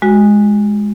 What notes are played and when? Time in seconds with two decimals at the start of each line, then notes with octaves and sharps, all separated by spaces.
0.02 G#3 F#4